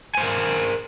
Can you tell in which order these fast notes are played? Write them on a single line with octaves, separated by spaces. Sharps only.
G#5 C5 F5 A#4